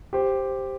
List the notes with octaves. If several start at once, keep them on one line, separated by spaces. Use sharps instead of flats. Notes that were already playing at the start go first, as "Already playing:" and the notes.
G4 C5